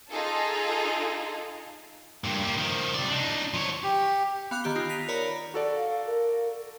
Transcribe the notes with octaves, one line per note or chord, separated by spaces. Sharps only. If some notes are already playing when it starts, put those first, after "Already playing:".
D#4 F4 G#4 A4
G2 A#2
A#3 G4
D#3 F3
C3 D5
D4 D#4
F3 C#5
G4
B3 F5 D6 F#6 G6
D#3 B3 G4 B5 G7
D#4 F4
F#6 A#6 B6 D#7 F7
A#4 C#5 D5 A#5 B5
F#4 A4 D5
F5
A#4